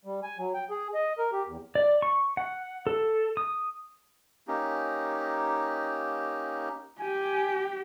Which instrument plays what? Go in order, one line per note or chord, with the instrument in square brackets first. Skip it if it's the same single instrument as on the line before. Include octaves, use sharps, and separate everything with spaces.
[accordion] G3
G#5
F#3
G5
G#4
D#5
A#4
G4
E2
[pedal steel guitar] D5
C#6
F#5
A4
D#6
[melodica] A#3 C#4 D#4 G4
[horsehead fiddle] G4 [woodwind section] G#5